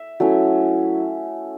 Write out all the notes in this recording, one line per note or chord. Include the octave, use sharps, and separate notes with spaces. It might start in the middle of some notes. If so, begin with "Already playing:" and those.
Already playing: E5
F#3 A3 C#4 E4